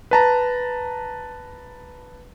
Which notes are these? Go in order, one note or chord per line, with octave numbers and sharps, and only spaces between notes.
B4 A5 A#5